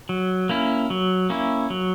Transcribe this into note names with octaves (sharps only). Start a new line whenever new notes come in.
F#3
A#3 C#4 E4
F#3
A#3 C#4 E4
F#3